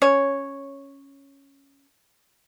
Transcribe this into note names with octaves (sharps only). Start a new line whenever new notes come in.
C#4 C#5